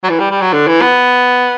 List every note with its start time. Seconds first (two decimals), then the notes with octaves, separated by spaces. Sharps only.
0.04 F#3
0.09 E3
0.20 G3
0.31 G3
0.41 F#3
0.53 D3
0.67 E3
0.82 B3